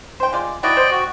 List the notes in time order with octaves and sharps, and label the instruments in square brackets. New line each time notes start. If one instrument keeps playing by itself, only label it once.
[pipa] C5 G5
G#3 F4 D5
[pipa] F#3 E4 C#6 [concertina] D5 D#5 G5
[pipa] C5
[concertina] F#4